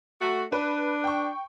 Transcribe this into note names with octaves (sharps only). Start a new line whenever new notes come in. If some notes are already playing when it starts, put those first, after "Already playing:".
A3 F#4
D4 B4
G5 C#6